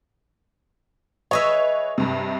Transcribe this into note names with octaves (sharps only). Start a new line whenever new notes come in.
G#4 B4 C#5 D#5 E5
G2 C3